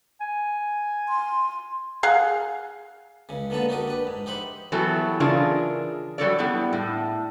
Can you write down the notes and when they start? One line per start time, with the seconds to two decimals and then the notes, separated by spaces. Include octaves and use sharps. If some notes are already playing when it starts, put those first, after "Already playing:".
0.21 G#5
1.09 C6
2.03 G#4 F5 F#5
3.29 C#2 C#3
3.50 D3 G#3 A#3 B3 A4 B4
3.69 D#4 F#4 G4 A#4 D#5
3.88 D4 B4
4.07 G#2
4.26 D#4 G4 C5 E5 F#5 B5
4.72 E3 F#3 G3 B3 F#4 A4
5.20 C#3 E3 D4 F4 G#4 A#4
6.18 F#3 G3 F#4 A4 A#4 D5
6.38 G3 B3 E4 G#4
6.73 A2